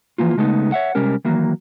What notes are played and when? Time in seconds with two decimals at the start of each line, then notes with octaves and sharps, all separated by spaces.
0.18 E3 F3 A#3 F4
0.37 C#3 G#3 A3 B3 D#4
0.72 C#5 E5 F#5
0.95 C3 G3 G#3 C#4 A#4
1.25 D#3 E3 F#3 A#3